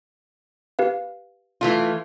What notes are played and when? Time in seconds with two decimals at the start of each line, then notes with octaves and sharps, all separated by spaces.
0.79 G4 B4 F5
1.61 E3 A3 F4